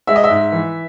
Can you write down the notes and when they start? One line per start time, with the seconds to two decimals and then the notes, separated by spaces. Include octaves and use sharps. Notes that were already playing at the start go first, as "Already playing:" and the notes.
0.07 G#3 E5
0.16 D#5
0.24 E5
0.30 G#2
0.52 E3